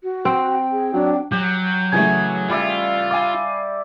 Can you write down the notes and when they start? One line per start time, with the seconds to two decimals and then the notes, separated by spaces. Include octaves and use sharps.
0.03 F#4
0.25 C4 G5
0.72 G#4
0.94 F#3 D4
1.32 F#3 G4
1.92 C#3 E3 A3 G#5
2.50 G3 F4 D5 E5
3.11 F5 G#5 D6